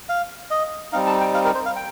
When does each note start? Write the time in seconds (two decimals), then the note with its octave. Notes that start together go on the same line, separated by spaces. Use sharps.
0.09 F5
0.51 D#5
0.93 G3 C4 D#4 F5
1.07 A5
1.20 G5
1.34 F5
1.45 A#4
1.55 C5
1.66 F5
1.76 G5